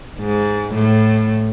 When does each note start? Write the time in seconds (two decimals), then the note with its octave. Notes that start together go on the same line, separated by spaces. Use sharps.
0.20 G#2
0.74 A2